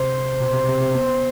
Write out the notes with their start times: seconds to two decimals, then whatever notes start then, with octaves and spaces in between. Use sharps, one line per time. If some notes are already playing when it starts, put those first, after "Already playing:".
Already playing: C3 C5
0.40 B2
0.54 C3
0.69 C3
0.82 C3
0.95 B3